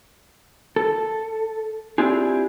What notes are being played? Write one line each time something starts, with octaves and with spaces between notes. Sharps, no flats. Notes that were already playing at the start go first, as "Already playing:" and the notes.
A4
C4 D4 E4 F4 G4 G#4